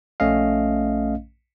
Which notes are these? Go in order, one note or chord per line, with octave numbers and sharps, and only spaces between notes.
A#1 A3 C#4 D#5 F5